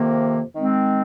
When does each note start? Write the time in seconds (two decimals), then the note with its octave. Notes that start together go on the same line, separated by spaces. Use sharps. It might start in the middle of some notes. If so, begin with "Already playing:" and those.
Already playing: F2 C3 D#3 A#3
0.55 D#3 G#3 C4